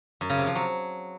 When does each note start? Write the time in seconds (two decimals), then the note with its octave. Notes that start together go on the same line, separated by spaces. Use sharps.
0.21 F#2
0.30 C#3
0.38 C3
0.47 F3
0.55 F#3